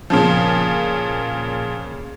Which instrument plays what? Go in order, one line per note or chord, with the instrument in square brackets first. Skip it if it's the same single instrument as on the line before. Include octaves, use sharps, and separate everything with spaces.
[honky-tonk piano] A#2 C#3 F3